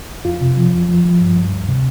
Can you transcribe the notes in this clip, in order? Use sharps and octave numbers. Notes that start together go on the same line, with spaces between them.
F2 F4
C3
F3
F2
F3
F3
G2
G2
D2
C3